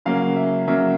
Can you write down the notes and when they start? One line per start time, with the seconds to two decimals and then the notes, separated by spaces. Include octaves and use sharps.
0.06 C#3 F#3 A#3 C#4 F5
0.36 E5
0.67 C#3 F#3 A#3 C#4 E5